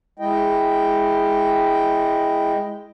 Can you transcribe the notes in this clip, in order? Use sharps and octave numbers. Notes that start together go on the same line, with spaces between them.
G#3 E4 D#5 G5